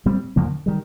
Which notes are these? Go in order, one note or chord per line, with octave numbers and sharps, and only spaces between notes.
A#2 G3 C4
F2 D3 F3 A#3
D#3 G3